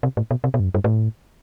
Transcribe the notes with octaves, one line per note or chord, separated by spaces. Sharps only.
C3
A2
B2
C3
B2
G2
F#2
G2
A2